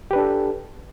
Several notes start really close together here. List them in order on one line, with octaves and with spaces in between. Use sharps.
G4 B4 D4 A4